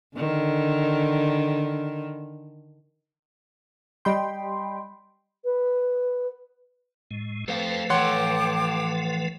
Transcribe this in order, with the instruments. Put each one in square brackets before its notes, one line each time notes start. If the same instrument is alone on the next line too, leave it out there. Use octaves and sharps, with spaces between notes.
[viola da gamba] D3 D#3
[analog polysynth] G3 G5 [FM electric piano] D#5 B5 C6
[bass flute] B4
[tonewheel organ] A2 G#3
[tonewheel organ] F3 A3 B4 [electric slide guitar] A4 C5 F5
[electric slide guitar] E3 A4 [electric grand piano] C#5 F#5 C6 [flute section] G5 A5 D6